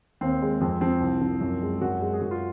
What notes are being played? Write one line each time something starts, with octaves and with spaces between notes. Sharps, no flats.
D#2 C4
G#3
F2 C4
F3 C4
C2
F3
F#2
G#3
F#2 F#4
G#3
G#4
F#2 F#4
F4